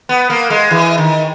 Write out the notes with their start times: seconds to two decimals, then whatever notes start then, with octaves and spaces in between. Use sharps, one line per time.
0.09 B3
0.30 A#3
0.50 G#3
0.71 E3
0.98 D#3